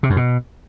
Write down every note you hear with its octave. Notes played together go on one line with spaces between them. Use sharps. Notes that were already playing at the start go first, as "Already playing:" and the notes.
C3
F#2
B2